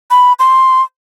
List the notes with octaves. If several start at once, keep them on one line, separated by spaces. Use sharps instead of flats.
B5
C6